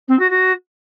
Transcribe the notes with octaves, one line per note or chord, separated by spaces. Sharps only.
C4
F#4
F#4